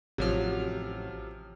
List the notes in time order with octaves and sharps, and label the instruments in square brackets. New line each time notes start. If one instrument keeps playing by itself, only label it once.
[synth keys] A1 F#3 F6 [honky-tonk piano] C3 F3